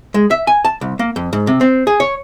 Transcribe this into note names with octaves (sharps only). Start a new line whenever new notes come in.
G#3
E5
G#5
A5
C2
A#3
F2
G#2
C3
C4
G#4
C#5